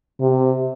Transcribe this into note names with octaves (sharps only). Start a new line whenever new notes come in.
C3